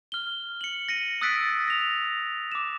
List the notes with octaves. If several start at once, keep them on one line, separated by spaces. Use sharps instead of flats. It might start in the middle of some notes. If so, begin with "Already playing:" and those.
F6 G7
C#7 F#7
A#6 C#7 D#7
D#6 E6 F#6 A6 B6 D7
A#6 F7
D6 E7